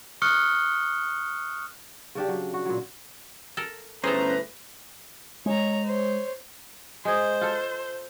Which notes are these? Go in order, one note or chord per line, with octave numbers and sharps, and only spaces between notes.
C#6 D#6 F6 F#6 C#7 G7
C#3 D4 G4
F#3
F#4
A#2 F#3
A4 A#4
G1 A2 C#4 G#4 A4 B4 C5 A#5
G#3 C#5 A#5
C5 C#5
G#3 G#4 C5
F4 A4